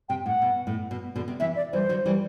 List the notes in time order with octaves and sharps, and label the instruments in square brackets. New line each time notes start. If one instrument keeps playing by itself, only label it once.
[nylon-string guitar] C3 [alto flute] G5
[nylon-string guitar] A2 [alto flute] F#5
[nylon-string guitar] B2
A2
B2
B2 D3
C3
[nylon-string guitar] C3 E3 [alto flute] E5
[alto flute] D5
[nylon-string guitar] E3 G3 [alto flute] C5
[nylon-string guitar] D3 F#3
E3 G3